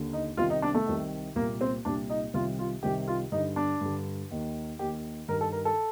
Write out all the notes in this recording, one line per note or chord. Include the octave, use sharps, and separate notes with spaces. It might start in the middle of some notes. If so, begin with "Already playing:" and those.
Already playing: D#2 D3
D#4
C2 C3 D#3 F4
D#4
D4
A3
C2 C3 D#3
C2 A#2 A#3
C4
C2 A#2 D4
D#4
C2 C3 D#3 F4
F4
C2 C3 D#3 G4
F4
G2 D3 D#4
D4
G2 D3
D#2 D#3
D#2 D#3 G4
G2 D#3 A#4
A4
A#4
A4